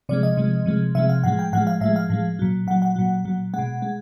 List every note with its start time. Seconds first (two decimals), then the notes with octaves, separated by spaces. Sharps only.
0.09 C3 F3 G#3 D5
0.23 D#5
0.37 C3 F3 G#3
0.66 C3 F3 G#3
0.95 C3 F3 G#3 E5
1.09 F5
1.24 A2 F3 G#3 F#5
1.39 G5
1.53 A2 F3 G#3 F#5
1.67 F5
1.81 A2 F3 G#3 E5
1.96 F5
2.10 A2 F3 G#3
2.39 A#2 F#3
2.67 A#2 F#3 F#5
2.82 F#5
2.96 A#2 F#3
3.25 A#2 F#3
3.54 B2 G#3 F#5
3.82 G#3